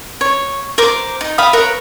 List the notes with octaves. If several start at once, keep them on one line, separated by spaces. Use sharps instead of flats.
C#5
A#4 C5 D6
D#4
E5 F5 B5 D#6
A#4 B4 C#5